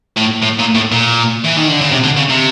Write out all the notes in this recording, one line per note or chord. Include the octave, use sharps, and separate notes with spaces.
A2
A2
A#2
A2
A#2
E3
D#3
D3
C#3
C3
D3
C#3
C3